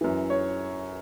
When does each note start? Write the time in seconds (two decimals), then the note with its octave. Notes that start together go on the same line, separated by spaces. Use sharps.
0.01 F#2 E3
0.30 C#5